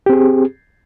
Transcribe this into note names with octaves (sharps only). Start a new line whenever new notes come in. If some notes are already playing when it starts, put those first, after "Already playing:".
C4 G4 G#4